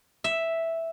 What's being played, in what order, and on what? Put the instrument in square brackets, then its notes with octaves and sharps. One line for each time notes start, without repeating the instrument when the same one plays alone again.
[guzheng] E5